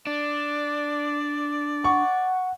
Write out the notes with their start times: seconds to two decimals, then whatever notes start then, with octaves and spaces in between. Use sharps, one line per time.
0.07 D4 D5
1.84 F#5 C#6